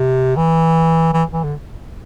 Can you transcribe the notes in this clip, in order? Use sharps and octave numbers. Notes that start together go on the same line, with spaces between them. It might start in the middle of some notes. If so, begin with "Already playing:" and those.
Already playing: C3
E3
E3
E3
D3